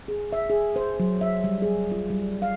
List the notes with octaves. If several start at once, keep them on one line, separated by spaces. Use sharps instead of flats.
G#4
E5
G#4
C5
F#3
E5
G3
G#4
F4
G3
F5